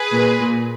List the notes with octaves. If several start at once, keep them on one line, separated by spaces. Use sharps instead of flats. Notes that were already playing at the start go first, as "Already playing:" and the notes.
Already playing: G#4 B4
A#2
A#2